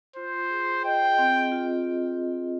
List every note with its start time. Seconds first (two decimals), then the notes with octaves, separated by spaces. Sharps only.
0.16 F4 C5
0.51 G#4
0.84 D#5 G5
1.18 C4
1.52 F4